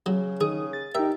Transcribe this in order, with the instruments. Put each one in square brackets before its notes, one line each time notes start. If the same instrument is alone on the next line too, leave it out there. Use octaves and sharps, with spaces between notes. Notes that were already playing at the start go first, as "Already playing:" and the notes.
[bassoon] C#3 [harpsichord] F#3
[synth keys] D#3 D#6 [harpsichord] G#4
[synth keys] A6
[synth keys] D#4 A#4 [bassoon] G4 [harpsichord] E5